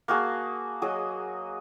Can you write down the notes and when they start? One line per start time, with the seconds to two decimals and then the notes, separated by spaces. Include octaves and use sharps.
0.08 A#3 F#4 G#4 A5
0.82 F#3 G#4 D#5